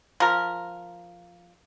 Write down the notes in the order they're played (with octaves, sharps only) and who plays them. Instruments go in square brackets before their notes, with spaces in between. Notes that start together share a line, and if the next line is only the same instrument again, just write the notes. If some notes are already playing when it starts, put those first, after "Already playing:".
[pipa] F3 A#4